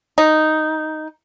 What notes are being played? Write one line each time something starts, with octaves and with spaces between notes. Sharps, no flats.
D#4